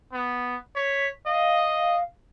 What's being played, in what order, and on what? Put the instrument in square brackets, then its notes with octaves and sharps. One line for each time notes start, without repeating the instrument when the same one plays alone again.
[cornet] B3
[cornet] C#5 [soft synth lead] B6
[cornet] D#5 [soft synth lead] F5